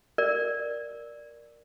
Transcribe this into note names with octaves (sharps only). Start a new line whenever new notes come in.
A#4 D5